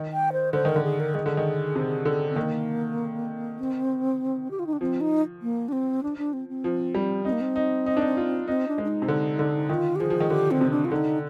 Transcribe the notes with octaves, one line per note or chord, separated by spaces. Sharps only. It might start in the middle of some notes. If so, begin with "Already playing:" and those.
Already playing: D#3
G5
C5
D3 C5
D#3 A#4
D3
G#4
A#4
D#3 G#4
D3
D#3
C3
D3
C4
D#3 A#3
C4
G4
F4
D#4
D4
F3 C4
D#4
A#3
D4
C4
D4
D4
C4
C4
F3
G3
C4 D#4
A#3
C4
D#4
D#4
D4
D#4
F4
C4 D#4
D4
G#3
D4
D#4
C3
D3
D3
D#3 F4
G4
F3 G#4
F3
D#3
D3 G4
C4
C3
D4
F4
D3 D#4